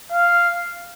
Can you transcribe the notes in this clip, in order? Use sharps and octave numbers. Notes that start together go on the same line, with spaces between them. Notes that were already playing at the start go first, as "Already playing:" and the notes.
F5